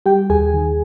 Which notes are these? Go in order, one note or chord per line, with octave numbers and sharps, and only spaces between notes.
G3 G4 G5
D#2 G#4 G#5
D#3